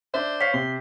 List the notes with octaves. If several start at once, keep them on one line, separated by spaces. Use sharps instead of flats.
D4 C5 E5
C#5 F5 B6 C7
C3 C6